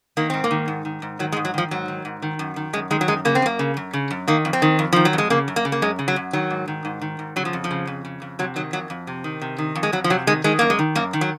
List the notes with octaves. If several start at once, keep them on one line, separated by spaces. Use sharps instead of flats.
D#3 A#3
G#2 C4
A#3
D#3
G#2
D#3
G#2
D#3 F#3
G#3
G#2
F#3
D#3 F3
G#2 F#3
D#3
G#2
D#3
F#2
D#3
F#2 G#3
D#3 G#3
F#3
F#2 G#3
C#3 A#3
C4
F#2 A#3
C#3
F#2
C#3
F#2
D#3 A#3
F2
C4
D#3
F2
D#3 F3
F#3
F2
G#3
C#3 A#3
F#2
A#3
C#3
A#3
F#2 G#3
C#3
F#3
F#2
D#3 F#3
G#2
D#3
G#2
D#3
G#2
C#3 F#3
F3
F2
F3
C#3
F2
C#3
F2
C3 F#3
D#3 F#3
F2 F#3
F2
C3
D#3
C3
D#3
F2
G#3
F2 F#3
F3
C3 F#3
D#3 G#3
D#3 G#3
F#2 A#3
G#3
D#3
F#2 A#3
D#3
F#3